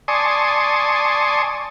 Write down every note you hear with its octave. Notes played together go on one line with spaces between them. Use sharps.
D5 G#5 A5 C6 C#6 D#6